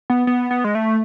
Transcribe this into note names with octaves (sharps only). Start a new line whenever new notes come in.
B3
B3
B3
G#3
A3